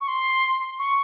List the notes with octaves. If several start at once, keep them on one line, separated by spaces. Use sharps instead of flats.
C#6
C6
C#6